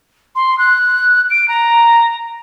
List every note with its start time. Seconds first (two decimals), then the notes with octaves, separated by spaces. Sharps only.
0.35 C6
0.58 F#6
1.30 D7
1.48 A#5